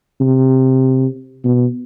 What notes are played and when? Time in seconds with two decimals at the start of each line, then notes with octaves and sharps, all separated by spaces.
0.21 C3
1.44 B2